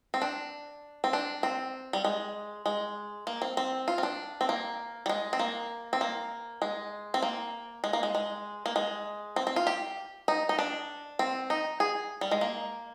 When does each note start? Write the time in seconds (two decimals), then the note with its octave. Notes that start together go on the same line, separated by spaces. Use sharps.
0.14 C4
0.22 D4
1.04 C4
1.13 D4
1.43 C4
1.93 G3
2.04 G#3
2.66 G#3
3.27 A#3
3.42 C4
3.57 C4
3.88 F4
3.98 C4
4.03 D4
4.41 C4
4.49 A#3
5.06 G3
5.09 G#3
5.33 C4
5.39 A#3
5.93 C4
6.01 A#3
6.62 G#3
7.14 C4
7.22 A#3
7.84 G#3
7.93 A#3
8.03 G#3
8.15 G#3
8.66 A#3
8.76 G#3
9.36 C4
9.47 C4
9.56 F4
9.67 G4
10.28 D#4
10.49 D#4
10.59 D4
11.19 C4
11.50 D#4
11.80 G#4
12.21 G3
12.31 G#3
12.41 A#3